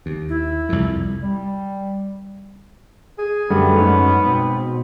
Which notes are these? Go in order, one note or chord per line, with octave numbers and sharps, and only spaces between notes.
D#2
E4
C2 F2
G3
G#4
F#2 D3 G3 A3 B3
G#2 C#4
B2 C4